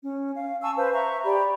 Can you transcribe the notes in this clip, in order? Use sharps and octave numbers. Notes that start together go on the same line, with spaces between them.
C#4
F5
G#5 A5 C#6 E6
B4 C5 F5
E5 A#5 C#6
G4 D5 B5